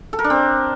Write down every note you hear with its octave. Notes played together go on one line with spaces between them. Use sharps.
A4
A#4
D4
C4